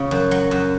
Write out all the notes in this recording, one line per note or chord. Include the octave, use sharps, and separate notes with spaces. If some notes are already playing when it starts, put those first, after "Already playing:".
Already playing: C#3
F#2
F#3
F#2